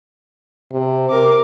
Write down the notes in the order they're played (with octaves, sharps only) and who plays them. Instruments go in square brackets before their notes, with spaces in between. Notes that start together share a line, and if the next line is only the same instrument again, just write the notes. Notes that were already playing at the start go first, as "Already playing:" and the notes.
[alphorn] C3
[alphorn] C3 [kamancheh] A#4 D6